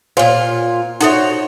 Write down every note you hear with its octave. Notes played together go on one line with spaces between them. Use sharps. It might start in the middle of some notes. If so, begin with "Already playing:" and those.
A#2 F4 C5 C#5 G#5
D#4 F#4 A4 C5 C#5 E5